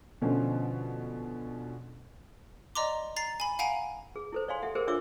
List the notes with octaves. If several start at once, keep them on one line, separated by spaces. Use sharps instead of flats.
B2 D3 F3 C#4
D5 D#5 A#5 C6 D6
A#5 A6 C7
G#5 B5
F5 F#5 G#5 A#5 D7
G#4
E4 A4 C5
C#5 D5 F5 G#5 C6
G4 A4 E5 F#5
G4 G#4 A#4 C5
D4 F4 C#5 E5 D6 E6